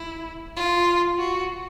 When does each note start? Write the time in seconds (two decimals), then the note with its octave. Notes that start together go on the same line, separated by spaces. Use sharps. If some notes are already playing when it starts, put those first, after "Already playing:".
Already playing: E4
0.57 F4
1.19 F#4